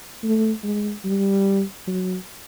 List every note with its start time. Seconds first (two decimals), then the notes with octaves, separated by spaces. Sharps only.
0.23 A3
0.63 G#3
1.05 G3
1.87 F#3